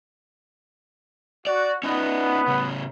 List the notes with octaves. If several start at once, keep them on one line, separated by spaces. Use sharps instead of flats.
F#4 D5
B3 C#4 D#4
A2 C#3